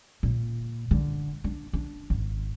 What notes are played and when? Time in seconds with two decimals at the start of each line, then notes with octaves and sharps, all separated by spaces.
0.23 A#2
0.91 D3
1.44 D4
1.73 D4
2.10 G#1